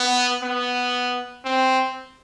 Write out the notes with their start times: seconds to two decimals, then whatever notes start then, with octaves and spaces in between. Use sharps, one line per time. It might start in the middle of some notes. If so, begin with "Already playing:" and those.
Already playing: B3
0.42 B3
1.45 C4